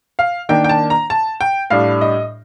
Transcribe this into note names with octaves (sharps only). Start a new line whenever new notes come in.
F5
D#3 A#3 D4 G5
G5
A5
A#5
A5
G5
A2 G3 D4 F5
D#5